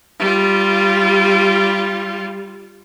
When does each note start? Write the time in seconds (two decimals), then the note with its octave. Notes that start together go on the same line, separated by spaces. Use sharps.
0.20 G3 F4